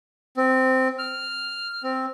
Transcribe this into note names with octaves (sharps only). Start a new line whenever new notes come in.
C4
F6
C4